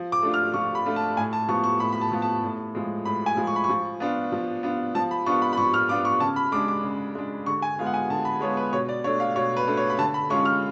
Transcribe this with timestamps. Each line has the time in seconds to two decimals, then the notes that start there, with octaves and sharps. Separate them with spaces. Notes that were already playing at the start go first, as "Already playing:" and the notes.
Already playing: F3
0.12 D6
0.23 A3 D4 F4
0.34 F6
0.54 F3 C#6
0.75 B5
0.86 A3 D4 F4
0.96 A5
1.17 A2 G#5
1.33 A5
1.48 F3 B3 C#6
1.64 C#6
1.80 A2 B5
1.92 B5
2.01 A5
2.12 F3 B3
2.22 A5
2.43 A2
2.75 F3 G#3
3.05 A2 B5
3.26 G#5
3.37 F3 G#3
3.47 C#6
3.56 B5
3.64 C#6
3.69 F3
4.00 B3 D4 F4
4.32 F3
4.63 B3 D4 F4
4.95 F3 A5
5.11 B5
5.26 B3 D4 F4 C#6
5.42 B5
5.53 B5
5.57 F3 C#6
5.74 F6
5.89 B3 D4 F4 D6
6.05 C#6
6.20 C#3 A5
6.36 B5
6.52 G#3 D4 D6
6.68 D6
6.83 C#3
7.15 G#3 D4
7.46 D3 C#6
7.62 G#5
7.79 G#3 B3 F4
7.86 F#5
7.94 G#5
8.10 D3 A5
8.25 B5
8.41 G#3 B3 F4 C#5
8.57 B4
8.72 B2 C#5
8.89 D5
9.04 A3 D4 C#5
9.20 F5
9.36 B2 C#5
9.57 B4
9.67 A3 D4
9.77 C#5
9.90 B5
9.98 D3 A5
10.14 B5
10.30 G#3 C#4 F4 C#6
10.45 F6